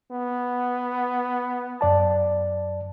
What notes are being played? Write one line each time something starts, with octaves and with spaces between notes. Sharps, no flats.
B3
F#2 D5 A5